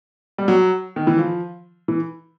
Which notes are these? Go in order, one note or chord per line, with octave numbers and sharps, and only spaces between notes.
G3
F#3
D#3
E3
F3
E3